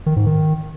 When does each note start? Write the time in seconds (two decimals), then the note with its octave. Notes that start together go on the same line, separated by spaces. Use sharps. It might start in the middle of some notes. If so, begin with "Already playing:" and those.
0.06 D#3
0.16 G#2
0.26 D#3